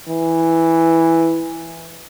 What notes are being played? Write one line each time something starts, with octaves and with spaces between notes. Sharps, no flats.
E3